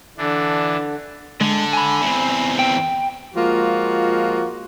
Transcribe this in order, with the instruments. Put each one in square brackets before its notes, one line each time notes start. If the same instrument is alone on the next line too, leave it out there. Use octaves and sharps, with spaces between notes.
[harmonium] D3 [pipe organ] E3 D4
[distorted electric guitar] D3 [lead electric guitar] G#3
[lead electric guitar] G#5 B5
[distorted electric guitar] E2 C4
[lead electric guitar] G5
[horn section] F3 G#3 A#3 F4 F#4